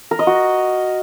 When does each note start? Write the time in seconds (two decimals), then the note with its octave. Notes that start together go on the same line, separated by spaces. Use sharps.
0.11 A#4
0.19 D#5
0.27 F#4